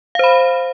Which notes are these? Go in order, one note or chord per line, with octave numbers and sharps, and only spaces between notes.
C5 F5 B5